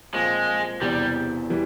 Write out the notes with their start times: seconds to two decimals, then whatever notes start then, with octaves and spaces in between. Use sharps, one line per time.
0.13 A#2 F3 G#3 C4
0.81 E1 E2 C3 E3 G3
1.50 E3 G3